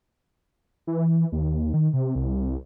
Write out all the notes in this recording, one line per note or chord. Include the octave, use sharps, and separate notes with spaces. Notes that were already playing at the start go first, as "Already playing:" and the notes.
E3
D#2
D#3
C3
C2